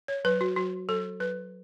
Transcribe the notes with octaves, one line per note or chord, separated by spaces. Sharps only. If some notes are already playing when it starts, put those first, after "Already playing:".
C#5
F#3 B4
F#4
F#3 F#4
F#3 A4
F#3 B4